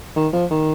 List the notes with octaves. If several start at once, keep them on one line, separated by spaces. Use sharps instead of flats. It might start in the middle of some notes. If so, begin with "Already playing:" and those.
D#3
F3
D#3